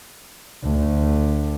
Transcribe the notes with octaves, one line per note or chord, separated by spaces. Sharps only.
D2